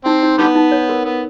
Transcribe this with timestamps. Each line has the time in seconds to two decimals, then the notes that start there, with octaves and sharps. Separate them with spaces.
0.05 C4 D#4
0.23 D#4
0.38 D3 G3 B3 D#4
0.55 D#4
0.71 C#5
0.89 A#4
1.05 B3 A#4